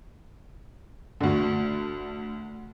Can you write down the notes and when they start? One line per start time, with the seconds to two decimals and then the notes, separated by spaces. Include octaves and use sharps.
1.21 D2 D3